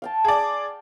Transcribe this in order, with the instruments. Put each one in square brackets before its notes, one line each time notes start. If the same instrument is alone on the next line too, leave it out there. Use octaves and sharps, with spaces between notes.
[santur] F5 G5 A5
[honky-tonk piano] G#4 D5